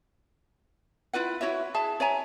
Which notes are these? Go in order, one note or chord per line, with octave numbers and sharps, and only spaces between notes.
E4 F4 B4 F#5
E4 F#4 C#5 E5
G#4 E5 A5
C#5 E5 G#5 A#5